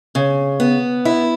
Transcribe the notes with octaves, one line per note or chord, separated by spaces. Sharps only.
C#3
B3
E4